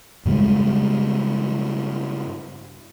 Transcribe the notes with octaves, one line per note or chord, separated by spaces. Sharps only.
G2 C#3 G3 G#3